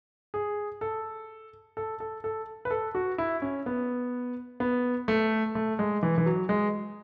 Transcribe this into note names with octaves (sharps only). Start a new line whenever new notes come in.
G#4
A4
A4
A4
A4
B4
A4
F#4
E4
C#4
B3
B3
A3
A3
G#3
E3
E3
F#3
G#3